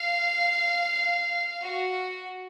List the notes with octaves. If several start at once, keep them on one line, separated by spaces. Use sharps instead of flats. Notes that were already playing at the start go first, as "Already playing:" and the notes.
Already playing: F5
F#4